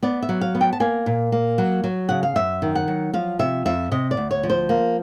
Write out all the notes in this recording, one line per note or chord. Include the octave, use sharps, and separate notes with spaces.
B3 D5
E5
F#3
F5
B3
G5
A5
A#3 G#5
A#2
A#3
F#3
F#3
C#3 F#5
F5
F#2 E5
D#3
F#5
F#3
F3 F5
C3 E5
F2 E5
C3 D#5
D5
D2
C#5
F3
C5
A#3